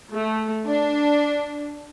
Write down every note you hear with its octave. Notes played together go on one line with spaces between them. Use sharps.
A3
D4